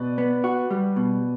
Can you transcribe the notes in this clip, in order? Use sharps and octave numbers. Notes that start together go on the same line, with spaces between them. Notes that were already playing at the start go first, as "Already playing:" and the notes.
Already playing: B2 B4 D5
B3
F#4
G3
B2